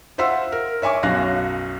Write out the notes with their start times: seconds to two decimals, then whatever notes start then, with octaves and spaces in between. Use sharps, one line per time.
0.18 F4 C5 E5 F#5 C6 E6
0.52 A#4
0.82 C#5 E5 G#5 C#6 D6
1.03 B1 F#2 F5 F#6 A#6